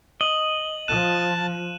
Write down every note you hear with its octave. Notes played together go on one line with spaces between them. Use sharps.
D#5 F#7
F3 A5 F#6 D#7 E7